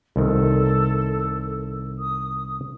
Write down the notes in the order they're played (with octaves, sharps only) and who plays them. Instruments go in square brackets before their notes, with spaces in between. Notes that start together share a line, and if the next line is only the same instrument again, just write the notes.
[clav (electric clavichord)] C2 D#3 [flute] A4
[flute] D#6